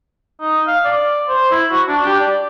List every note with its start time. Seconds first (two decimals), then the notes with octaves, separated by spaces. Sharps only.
0.41 D#4
0.67 F5
0.85 D5
1.29 C5
1.51 E4
1.71 F#4
1.89 D4
2.06 G4
2.20 D5